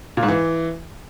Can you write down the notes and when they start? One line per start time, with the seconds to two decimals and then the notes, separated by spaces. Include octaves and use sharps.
0.17 A#2
0.23 G#2
0.28 E3